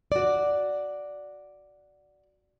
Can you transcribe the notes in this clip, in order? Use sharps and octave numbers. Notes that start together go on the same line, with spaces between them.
F#4 D5